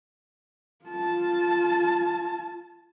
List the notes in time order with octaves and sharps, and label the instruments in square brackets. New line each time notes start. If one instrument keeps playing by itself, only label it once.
[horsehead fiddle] F4 A5